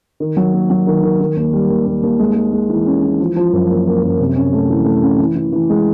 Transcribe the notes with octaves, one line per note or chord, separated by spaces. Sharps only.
D#3
F#3
A#3
F#3
D#3
D#3
D#3
D#2
G3
D#2
D#2
D#2
G#3
G#3
G#3
E3
C#4
E3
F3
F3
F#2
A#3
A#3
F#2
C3
C#4
A3
E3
A3
C#4
E3
E3
E3
G#3